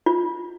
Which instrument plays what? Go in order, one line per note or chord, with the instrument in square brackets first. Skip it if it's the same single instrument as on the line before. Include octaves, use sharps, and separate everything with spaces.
[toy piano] F4